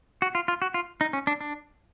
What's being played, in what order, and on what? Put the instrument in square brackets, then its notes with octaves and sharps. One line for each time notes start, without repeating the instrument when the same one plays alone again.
[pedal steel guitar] F#4
F4
F4
F#4
F4
D#4
C#4
D4
D4